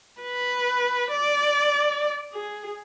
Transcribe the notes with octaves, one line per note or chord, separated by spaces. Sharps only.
B4
D5
G#4